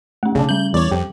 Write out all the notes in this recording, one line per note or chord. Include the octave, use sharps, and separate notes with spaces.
A3 C#4 F#5
B1 C#3 D4
G3 C#4 G6 F#7
E2 C#5 D5
F2 G4